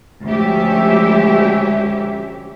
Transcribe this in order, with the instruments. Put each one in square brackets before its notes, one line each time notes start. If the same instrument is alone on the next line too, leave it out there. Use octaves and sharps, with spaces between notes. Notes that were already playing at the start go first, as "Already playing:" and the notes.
[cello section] D2 F3 G#3 C#4 G4 E5